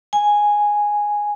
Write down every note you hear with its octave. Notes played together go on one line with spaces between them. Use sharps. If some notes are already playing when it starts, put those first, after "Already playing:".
G#5